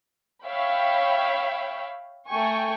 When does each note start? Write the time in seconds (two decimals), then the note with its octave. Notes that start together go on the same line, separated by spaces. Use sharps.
0.44 C#5 E5 F5 G5 B5
2.28 A3 G5 G#5 C#6